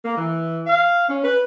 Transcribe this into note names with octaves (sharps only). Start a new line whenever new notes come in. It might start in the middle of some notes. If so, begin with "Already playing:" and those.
A#3
E3
F5
C#4
B4